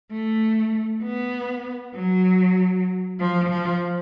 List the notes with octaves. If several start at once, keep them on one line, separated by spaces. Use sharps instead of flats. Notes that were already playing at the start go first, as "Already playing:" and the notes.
A3
B3
F#3
F3
F3